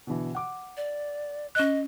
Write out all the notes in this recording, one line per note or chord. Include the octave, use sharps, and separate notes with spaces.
B2 D3 E3
F#5 D6
D5
C#4 D#5 F#6